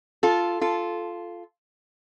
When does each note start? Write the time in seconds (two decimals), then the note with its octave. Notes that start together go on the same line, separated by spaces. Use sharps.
0.23 F4 A4
0.61 F4 A4